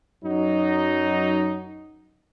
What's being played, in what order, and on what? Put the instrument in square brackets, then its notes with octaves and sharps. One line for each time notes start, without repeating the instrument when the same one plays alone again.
[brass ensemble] F#2 F#3 D#4